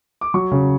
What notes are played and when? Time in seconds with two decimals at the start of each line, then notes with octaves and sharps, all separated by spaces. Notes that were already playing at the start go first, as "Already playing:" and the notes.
0.21 D6
0.34 F#3 C#6
0.51 C#3